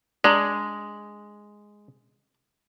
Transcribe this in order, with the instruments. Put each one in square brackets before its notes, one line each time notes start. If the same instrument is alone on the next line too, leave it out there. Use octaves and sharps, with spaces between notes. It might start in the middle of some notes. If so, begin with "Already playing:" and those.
[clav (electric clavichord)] G#3 [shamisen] D4 A#5